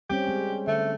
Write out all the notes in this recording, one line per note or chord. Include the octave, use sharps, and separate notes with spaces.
G3 C4 C#4 G4
G#3 C4
D3 A3